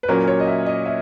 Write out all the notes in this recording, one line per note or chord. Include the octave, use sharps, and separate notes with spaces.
B4
A#2 F#3 A#3 C#4 A#4
C#5
D#5
E5
D#5
E5